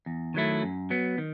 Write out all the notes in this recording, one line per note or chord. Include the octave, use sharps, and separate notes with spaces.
E2
D#3 F#3 A3 E4
F#2
F#3 B3
D#3